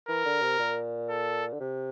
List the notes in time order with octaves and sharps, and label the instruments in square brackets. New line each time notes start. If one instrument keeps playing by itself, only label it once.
[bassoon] E3 [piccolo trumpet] A#4
[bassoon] D3
C3
A#2
[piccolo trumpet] A4
[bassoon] D3
C3